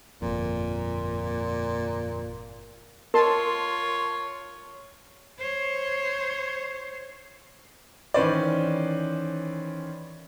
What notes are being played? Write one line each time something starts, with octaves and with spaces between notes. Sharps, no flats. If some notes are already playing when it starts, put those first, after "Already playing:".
G1 F2 A#2
F4 A#4 C#5 A5 C6
C5 C#5
D#3 E3 C#4 B4 C5 D5